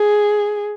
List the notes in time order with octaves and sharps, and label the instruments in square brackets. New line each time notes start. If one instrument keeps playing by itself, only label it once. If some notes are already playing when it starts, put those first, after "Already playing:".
Already playing: [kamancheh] G#4